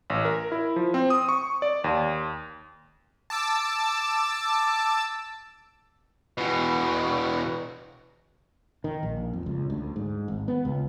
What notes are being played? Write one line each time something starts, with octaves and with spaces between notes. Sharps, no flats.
A1
A#4
E4
F3
C4
D#6
C#6
D5
D#2
A5 D6 E6
E2 B2
D#3
A#1
F2
C#2
D2
G#2
G#1
B3
C#2